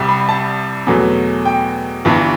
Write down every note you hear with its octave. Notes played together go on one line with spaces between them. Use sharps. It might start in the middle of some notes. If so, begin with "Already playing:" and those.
Already playing: C2 C3 G3
B5
A5
E2 B2 F#3 A3
G5
G1 G2 E3